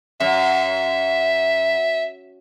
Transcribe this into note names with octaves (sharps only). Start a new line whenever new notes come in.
F#2 E5